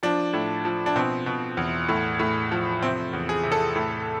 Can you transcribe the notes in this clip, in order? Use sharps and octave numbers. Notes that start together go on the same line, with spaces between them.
F3 D4
A2
F3
D4
B2 C4
B2
E2
A2
A2
F3
C3 C4
E2
G#4
C3
A4
A2